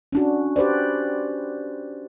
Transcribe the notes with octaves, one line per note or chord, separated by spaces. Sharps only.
C#4 D4 F#4
G4 B4 C5 D5